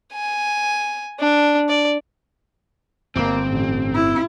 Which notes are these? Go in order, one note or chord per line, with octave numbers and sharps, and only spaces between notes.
G#5
D4
D5
D1 G1 A#3 C4
A1
E4